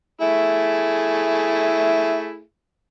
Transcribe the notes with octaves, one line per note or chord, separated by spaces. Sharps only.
A3 E4 G#4